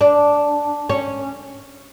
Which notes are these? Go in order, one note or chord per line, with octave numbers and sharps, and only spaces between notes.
D4
C#4